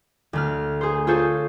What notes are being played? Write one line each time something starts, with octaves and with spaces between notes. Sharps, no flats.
D2 A3 F6
G#4 C5
F4 G#4 A4 C5 C#5